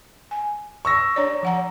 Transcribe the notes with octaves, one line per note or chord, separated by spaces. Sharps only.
G#5
C#6 E6 A#6
D4 C#5 D5
F3 F#5 A#5